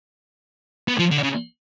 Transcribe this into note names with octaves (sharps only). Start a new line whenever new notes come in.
B3
F3
D3
C#3